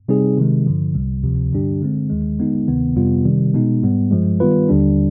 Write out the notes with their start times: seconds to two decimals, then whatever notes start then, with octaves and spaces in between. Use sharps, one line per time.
0.08 C3 G3 C4 D#4 G#4
0.38 C3 D#3 G#3
0.66 G2 D3 F3
0.95 C2 C3 G3
1.23 D2 C3 F3
1.53 G2 D3 G3 D4 G4
1.81 D3 G#3 C4
2.10 D#2 D#3 G#3
2.38 D3 G#3 B3 D#4
2.68 D2 C3 D#3 B3
2.96 F2 C3 G3 B3 F4
3.25 C3 D#3 G3
3.54 B2 G#3 B3 D#4
3.83 G#2 G3 B3
4.11 G2 F3 G#3
4.40 D#3 G3 B3 F4 B4
4.69 D#2 D3 G3 D4